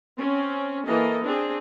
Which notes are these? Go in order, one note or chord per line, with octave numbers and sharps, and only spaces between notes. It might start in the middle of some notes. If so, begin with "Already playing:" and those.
C4 C#4
E3 A#3 A4 D#5
C4 D4 G#4